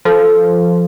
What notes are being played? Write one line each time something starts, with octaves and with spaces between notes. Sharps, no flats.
F3 A4